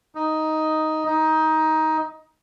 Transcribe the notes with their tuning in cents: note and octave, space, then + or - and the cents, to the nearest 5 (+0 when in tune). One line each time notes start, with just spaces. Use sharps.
D#4 +5
D#4 +15